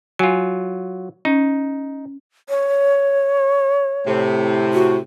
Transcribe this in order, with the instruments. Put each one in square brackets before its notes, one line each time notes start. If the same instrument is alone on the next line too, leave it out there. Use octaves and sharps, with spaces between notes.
[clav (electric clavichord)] F#3 F4 [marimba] G#5
[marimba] C#4 [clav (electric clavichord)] D#4
[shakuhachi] C#5
[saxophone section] A2 C3
[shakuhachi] F#4